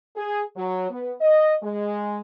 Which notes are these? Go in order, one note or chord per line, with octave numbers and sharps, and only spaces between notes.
G#4
F#3
B3
D#5
G#3